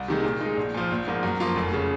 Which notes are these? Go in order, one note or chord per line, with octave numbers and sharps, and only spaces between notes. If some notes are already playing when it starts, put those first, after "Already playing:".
Already playing: C2
C3 D#3 G#3
A#2
G#3 D#4
A#1
A#2 F3
A#1
G#2 F3 A#3
F#2
F3 A#3 F4
F1
C#3